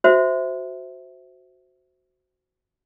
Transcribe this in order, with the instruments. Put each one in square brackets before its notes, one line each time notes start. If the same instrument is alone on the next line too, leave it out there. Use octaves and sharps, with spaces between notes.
[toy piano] F#4 C5 E5